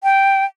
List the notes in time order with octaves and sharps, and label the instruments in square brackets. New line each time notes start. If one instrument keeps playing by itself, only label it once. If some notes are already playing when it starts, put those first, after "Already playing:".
[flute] G5